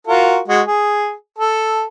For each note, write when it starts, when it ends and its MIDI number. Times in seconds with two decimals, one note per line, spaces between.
0.07 0.39 65
0.07 0.39 66
0.07 0.39 70
0.48 0.62 56
0.48 0.62 66
0.67 1.13 68
1.38 1.84 69